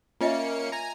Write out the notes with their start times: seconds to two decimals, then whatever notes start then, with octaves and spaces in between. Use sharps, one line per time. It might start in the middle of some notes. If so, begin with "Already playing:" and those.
0.21 A#3 C#4 F4 D#5 E5 C#7
0.72 G#5 A#5